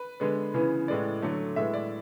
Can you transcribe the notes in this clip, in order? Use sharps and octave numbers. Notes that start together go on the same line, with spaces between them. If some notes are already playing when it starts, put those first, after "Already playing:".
Already playing: B4
D3 G#3 B3
C#3 E3 B3
A2 G#3 B3 D5
D3 F#3 A3
A2 G#3 B3 E5
D5